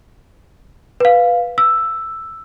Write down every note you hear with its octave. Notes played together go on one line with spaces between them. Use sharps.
B4 F5
E6